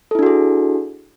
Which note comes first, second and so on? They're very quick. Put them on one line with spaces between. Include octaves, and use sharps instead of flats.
A4 E4 D4 F#4 G#4